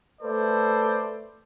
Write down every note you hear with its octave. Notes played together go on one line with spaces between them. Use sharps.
A3 A4 B4 C5 D5